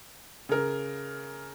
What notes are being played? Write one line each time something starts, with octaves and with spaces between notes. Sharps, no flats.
C#3 A#4